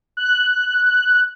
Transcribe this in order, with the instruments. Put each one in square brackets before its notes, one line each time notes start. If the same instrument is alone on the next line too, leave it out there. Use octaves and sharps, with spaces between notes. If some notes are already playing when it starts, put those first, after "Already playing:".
[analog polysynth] F#6